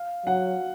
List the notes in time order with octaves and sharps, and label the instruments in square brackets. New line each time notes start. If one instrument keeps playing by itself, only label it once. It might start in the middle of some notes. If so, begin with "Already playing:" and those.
Already playing: [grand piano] F5
[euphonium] F#3 [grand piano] F#5